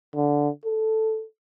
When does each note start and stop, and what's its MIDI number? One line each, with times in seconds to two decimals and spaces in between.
0.15 0.49 50
0.65 1.25 69